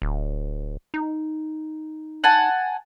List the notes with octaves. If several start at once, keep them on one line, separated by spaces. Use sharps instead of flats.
D1
D#4
F#5 G#5 A5